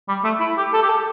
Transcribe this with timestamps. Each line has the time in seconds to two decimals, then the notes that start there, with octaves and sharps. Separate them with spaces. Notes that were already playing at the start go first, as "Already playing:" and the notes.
0.08 G3
0.24 A3
0.40 E4
0.57 G4
0.74 A4
0.82 G4
0.89 A4